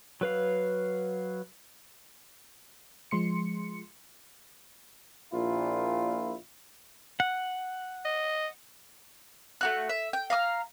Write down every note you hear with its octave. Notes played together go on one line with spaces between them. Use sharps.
F#3 B4 F5
F3 G#3 C6 C#7
A#1 A#2 E4 F4
F#5
D#5
A3 F#4 F#6
E5
G5
F5 A#5 D#6 F6